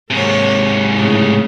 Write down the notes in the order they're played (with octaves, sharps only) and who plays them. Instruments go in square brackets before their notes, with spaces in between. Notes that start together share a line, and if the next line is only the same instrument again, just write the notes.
[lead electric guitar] G#2 C3 [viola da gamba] A#3 C#5
[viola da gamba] A2 C#3 A3